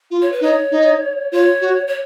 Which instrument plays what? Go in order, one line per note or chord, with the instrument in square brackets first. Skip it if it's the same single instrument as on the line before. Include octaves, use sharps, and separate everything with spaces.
[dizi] F4
[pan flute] C#5
B4
[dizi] D#4 [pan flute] C#5
[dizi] D#4
[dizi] F4 [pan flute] C#5
[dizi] F#4
[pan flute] C#5